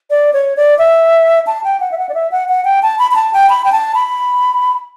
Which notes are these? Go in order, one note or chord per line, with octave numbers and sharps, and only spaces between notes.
D5
C#5
D5
E5
A5
G5
F#5
E5
F#5
D5
E5
F#5
F#5
G5
A5
B5
B5
A5
G5
B5
G5
A5
B5